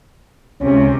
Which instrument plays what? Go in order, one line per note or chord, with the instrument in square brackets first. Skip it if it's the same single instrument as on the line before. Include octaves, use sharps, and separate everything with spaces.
[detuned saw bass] C#2 [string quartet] C3 [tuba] C#4